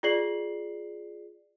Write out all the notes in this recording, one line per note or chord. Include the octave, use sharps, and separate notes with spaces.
F4 G#4 D5 C7 F#7